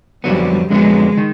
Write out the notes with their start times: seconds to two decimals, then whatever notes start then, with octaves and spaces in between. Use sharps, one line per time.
0.24 F2 D3 F#3 G3 B3
0.70 F2 D3 F#3 G#3 B3
1.17 D#3